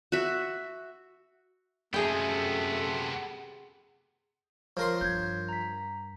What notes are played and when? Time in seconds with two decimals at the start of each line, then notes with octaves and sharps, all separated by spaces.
0.12 F#4 E5
1.94 F#2 C3 A3 B3 G#4 A4 G5
4.77 F3 A#4 C5 C#5 C6
5.01 G2 G6 G#6
5.49 A#5 B6